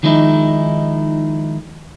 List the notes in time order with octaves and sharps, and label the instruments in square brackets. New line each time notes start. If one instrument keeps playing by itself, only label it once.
[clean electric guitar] D#3 F3 G#3 D#4 E4